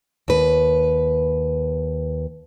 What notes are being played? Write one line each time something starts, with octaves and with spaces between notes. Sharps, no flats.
D#2 B4